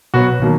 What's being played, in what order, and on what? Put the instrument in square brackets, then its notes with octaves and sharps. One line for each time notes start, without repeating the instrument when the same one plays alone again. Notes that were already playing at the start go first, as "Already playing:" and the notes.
[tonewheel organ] B2 [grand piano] F#3 B3 F#4
[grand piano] B2 F#3 A#3 [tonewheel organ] D#3